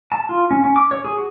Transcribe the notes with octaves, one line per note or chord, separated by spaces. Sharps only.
A5
F4
C#4
C#4
D6
C#5
G#4
F#4